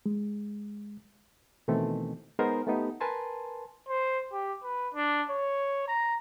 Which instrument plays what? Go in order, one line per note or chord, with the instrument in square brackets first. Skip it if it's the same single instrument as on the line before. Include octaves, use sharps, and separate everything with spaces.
[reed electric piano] G#3
B2 D#3 E3 A3 C4
G#3 B3 D#4 G#4 A#4 C5
A3 B3 D#4 G4
A#4 B4 G#5 A5 C6
[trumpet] C5
G4
B4
D4
C#5
A#5